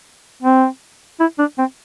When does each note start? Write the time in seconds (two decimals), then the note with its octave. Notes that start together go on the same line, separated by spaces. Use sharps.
0.43 C4
1.20 E4
1.39 D4
1.59 C4